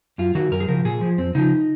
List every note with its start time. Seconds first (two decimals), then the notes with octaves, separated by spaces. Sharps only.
0.18 F#2 F4
0.35 D#3 F#4
0.51 F#2 A#4
0.60 G#4
0.69 C#3 F3 A#4
0.85 A#2 G#4
1.01 F3
1.18 F2 C4
1.35 C#3 F3 D#4